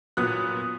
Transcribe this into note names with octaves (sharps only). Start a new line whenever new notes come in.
A#2 F#3 B3 D#6 F#6